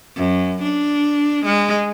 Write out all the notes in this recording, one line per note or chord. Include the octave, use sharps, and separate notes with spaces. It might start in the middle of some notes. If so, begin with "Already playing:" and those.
F#2
D4
G#3